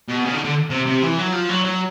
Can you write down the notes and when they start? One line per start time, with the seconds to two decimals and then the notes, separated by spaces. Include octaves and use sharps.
0.08 B2
0.25 C#3
0.34 D3
0.44 D3
0.70 C3
0.86 C3
1.02 E3
1.18 F#3
1.32 F3
1.49 F#3
1.65 F#3